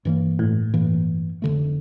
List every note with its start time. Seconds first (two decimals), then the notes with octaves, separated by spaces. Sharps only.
0.05 G2 E3 A#3
0.39 A2
0.74 G2 E3 A#3
1.42 F1 F2 D3 A3